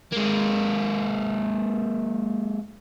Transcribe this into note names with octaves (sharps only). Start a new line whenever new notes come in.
G#3 A#3